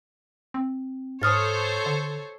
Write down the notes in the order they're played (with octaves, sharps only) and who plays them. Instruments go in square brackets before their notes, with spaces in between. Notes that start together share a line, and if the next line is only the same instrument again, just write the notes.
[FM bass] C4
[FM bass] G#2 [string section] A4 C5 C#5 [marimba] D#6 F6 A6
[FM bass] D3